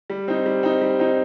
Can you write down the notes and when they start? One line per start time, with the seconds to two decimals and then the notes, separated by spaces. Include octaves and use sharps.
0.10 G3
0.28 C4 D#4
0.46 G3
0.63 C4 D#4
0.81 G3
0.99 C4 D#4